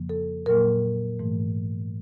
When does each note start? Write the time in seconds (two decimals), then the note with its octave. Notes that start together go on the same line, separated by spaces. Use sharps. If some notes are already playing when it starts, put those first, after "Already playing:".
Already playing: F2 C#3 F3 A#3
0.09 A4
0.46 A#2 F#3 A#3 A#4
1.19 G#2 E3 A3